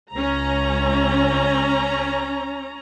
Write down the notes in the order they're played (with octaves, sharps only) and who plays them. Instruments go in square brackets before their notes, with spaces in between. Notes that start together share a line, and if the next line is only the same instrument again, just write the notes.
[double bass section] C#2 [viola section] C#4 A#5